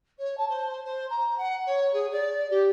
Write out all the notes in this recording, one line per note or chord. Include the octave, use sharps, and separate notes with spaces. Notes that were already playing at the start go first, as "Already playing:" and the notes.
C#5
A5
C5
C5
A#5
F#5
C#5
G#4
D5
G4